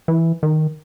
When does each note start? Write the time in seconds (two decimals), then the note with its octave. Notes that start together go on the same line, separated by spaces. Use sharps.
0.08 E3
0.43 D#3